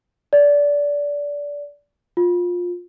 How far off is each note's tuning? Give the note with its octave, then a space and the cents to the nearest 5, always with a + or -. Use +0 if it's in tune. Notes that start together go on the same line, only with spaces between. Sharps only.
D5 -20
F4 +20